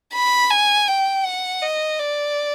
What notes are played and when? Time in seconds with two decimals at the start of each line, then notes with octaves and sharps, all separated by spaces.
0.14 B5
0.51 G#5
0.88 G5
1.25 F#5
1.63 D#5
1.99 D5